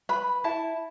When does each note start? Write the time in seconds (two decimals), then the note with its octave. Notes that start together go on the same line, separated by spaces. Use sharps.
0.09 B4 B5
0.44 E4 A5